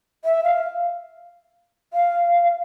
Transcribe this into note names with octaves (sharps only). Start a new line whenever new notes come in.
E5
F5
F5